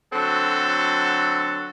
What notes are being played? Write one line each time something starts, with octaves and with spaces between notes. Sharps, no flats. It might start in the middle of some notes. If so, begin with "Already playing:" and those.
D3 F#3 C4 F#4 A4